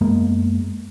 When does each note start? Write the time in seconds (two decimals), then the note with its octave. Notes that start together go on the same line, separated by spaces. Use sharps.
0.01 F#2 G#3 A#3 B3